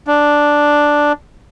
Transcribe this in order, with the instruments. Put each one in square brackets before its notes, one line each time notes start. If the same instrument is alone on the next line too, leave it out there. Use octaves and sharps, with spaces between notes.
[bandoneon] D4